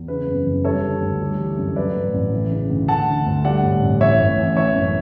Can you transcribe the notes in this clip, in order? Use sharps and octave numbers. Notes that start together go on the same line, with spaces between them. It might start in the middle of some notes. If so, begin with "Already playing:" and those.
Already playing: E2
C#3 B4
F#2
F#1
G3 A4 C#5
D3
D2
G3
E3
F#2
F#3 B4 D5
A2
A1
E3
C#3
D2
A3 F#5 A5
D3
D2
G3 D5 F#5
A2
A1
E3 C#5 E5
A2
A1
E3 C#5 E5
F#2